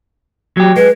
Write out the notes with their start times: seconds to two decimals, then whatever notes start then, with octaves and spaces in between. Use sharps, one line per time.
0.57 F#3 G4
0.76 G#3 B4